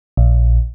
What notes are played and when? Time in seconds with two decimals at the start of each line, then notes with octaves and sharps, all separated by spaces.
0.17 A#1